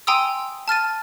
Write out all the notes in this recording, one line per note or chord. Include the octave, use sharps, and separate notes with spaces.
G5 G#5 A#5 C6 D#6 E6
A5 F6 A6 D#7